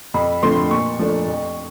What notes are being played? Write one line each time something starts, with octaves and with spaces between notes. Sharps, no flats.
F2 B5
D3 F3 A3 C4 C6
A#2 C#6
F3 A3 D4
F2